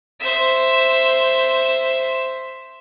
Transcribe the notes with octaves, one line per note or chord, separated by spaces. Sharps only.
C5 E5